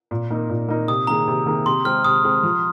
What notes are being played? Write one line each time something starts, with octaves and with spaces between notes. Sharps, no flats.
A#2
A#3 D#4 A#4
A#2
A#3 D#4 A#4
C3 D#6
D#3 A#3 G#4 A#5
C3
D#3 A#3 G#4
C3 C6
G#3 C4 G#4 F6
C3 D#6
G#3 C4 G#4
F3